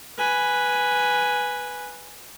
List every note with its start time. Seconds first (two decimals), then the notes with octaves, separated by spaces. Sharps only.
0.18 B4 G#5